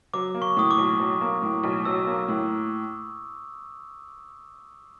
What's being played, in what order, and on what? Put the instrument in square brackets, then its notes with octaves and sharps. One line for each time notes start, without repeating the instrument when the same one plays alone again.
[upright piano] F#3 [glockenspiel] D6
[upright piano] A#3
[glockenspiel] C#6
[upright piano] A2 [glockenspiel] D#6
[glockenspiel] D6
[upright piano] B1
F#3
A#3
A2
B1
[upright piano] F#3 [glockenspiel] E6
[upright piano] A#3
A2